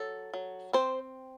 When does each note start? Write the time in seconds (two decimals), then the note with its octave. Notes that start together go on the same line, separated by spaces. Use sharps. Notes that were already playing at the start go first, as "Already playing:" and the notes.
Already playing: F#3 A4
0.34 F#3
0.73 C4 C5